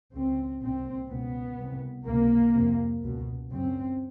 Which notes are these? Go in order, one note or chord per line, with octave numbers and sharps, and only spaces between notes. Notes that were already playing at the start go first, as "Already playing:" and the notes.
C#2 C#3 C4
C2 A#2 C4
C#2 B2 B3
C2 C3
C#2 C3 A#3
F2 C3
C#2 B2
F#2 C#3 C4